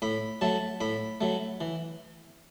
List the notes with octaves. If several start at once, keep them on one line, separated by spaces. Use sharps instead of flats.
A2 B5
F#3 A3 A5
A2 B5
F#3 A3
E3